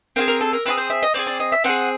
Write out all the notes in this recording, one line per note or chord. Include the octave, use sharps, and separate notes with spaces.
C4 F4 G#4 A#4
A#4
A4
A#4
C4 F4 G#4 B4
C5
E5
D#5
C4 D#4 G#4 D5
D5
D#5
E5
C4 D#4 G#4 F#5